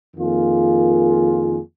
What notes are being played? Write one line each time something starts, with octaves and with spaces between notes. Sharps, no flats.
F2 D#3 A#3 F4 G#4